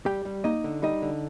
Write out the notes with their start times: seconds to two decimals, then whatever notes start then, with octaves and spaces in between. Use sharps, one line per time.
0.06 G3 G4 G5
0.25 G3
0.44 A#3 D#4 D#5
0.64 D3
0.82 G3 D#4 D#5
1.02 D3